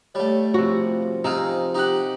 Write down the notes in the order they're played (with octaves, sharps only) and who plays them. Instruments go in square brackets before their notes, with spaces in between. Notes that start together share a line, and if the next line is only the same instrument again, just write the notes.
[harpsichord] G3 A3 [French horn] C#5
[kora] C3 F#4 [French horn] F3
[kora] C3 [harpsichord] D#4 G#4 F5
[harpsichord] D#4 G4 F#5